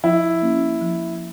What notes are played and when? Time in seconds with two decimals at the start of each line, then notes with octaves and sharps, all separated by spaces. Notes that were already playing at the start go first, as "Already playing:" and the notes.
0.04 F3 E4
0.42 A#3 C#4
0.82 F3